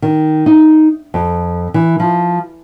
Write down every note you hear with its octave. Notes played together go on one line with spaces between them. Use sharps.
D#3
D#4
F2
E3
F3